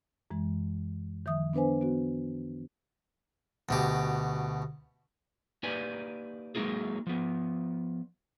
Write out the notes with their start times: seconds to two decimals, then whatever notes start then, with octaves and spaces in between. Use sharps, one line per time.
0.31 F#2 E3 G#3
1.26 D#3 F3 E5 D#6
1.53 B3 D4 B4 C5 G#5
1.81 B3 F#4
3.69 D2 B2 G4
5.63 A#3 D#4 G4 B4 D5 G#5
6.55 F#3 G#3 A#3 D#4 F4 G#4
7.07 F3 B3